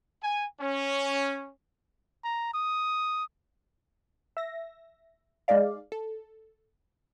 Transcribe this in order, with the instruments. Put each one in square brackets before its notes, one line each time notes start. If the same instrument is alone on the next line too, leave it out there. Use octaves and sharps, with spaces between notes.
[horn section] G#5
C#4
[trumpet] A#5
D#6
[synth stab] E5 A#6
G#3 D#4 G#4 D5 F5
A4